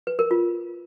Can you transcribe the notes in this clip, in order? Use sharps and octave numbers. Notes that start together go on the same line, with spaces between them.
B4
A#4
F4